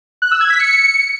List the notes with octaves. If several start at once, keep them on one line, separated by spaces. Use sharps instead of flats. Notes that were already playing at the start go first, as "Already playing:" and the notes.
F#6
E6
G#6
B6
C#7